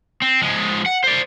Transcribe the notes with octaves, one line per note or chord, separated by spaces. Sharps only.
C4
F3 G#3
F#5
C5 D5